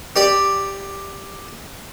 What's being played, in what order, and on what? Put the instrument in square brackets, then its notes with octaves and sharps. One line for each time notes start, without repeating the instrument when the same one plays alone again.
[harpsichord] G4 D5